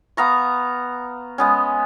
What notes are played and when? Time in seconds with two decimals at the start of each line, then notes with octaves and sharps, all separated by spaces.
0.17 B3 F5 A#5 C#6
1.38 G#3 B3 C#4